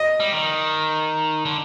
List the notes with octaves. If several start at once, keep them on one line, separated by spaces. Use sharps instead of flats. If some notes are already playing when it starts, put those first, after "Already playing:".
Already playing: D#5
G3
D#3
D3